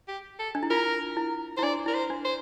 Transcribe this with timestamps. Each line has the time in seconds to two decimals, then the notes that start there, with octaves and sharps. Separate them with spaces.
0.08 G4
0.40 A4
0.55 D4
0.63 E4
0.70 F4 A#4
1.17 E4
1.57 E4 C5
1.63 D4 D5
1.86 E4 A#4
1.94 C5
2.10 D4
2.25 C5